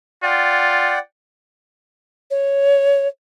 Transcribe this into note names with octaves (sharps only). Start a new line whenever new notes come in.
F4 D5 F#5 G5
C#5